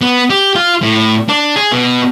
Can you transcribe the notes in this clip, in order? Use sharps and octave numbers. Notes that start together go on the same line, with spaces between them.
B3
G4
F4
A2
D4
G#4
B2